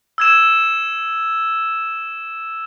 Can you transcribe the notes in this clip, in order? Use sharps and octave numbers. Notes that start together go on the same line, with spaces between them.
E6 G#6 E7